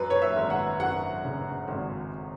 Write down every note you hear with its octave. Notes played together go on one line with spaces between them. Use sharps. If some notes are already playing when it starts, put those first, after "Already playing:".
Already playing: F#2 B4
C#5
E5
G#1
F#5
F#2 F#5
C#3
G#1